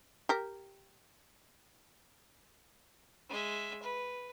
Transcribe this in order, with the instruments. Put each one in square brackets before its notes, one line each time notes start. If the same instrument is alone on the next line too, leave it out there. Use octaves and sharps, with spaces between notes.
[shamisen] G4 A#4
[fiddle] G#3 E5
B4